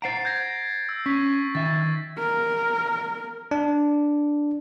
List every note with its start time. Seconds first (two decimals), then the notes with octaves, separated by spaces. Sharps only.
0.02 C5 F#5 A#5 A6 C7 D7
0.25 G6 G#6 A#6
0.89 E6
1.06 C#4 C#6 B6
1.55 D#3 E5 A6
2.18 A#4
3.51 D4